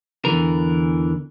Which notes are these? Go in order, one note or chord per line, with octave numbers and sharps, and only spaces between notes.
E2 D3 E3 A#4